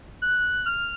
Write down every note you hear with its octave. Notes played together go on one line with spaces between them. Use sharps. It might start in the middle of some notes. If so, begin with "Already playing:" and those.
F#6
F6